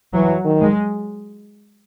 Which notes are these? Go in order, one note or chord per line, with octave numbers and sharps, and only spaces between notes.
E3 F#3
D#3
G#3